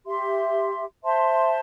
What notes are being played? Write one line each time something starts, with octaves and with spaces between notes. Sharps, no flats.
G4 E5 C6
C5 E5 A5 C6